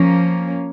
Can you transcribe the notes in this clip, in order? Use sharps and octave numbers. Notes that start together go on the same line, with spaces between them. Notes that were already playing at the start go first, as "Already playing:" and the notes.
Already playing: F3 A#3 C#4